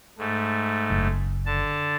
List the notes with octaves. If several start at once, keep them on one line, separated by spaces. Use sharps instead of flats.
G#2 A3
F#1
D3 A5